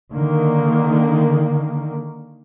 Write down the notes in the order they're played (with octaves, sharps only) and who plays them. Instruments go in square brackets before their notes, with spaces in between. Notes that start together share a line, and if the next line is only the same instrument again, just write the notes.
[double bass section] D3 D#3 A#3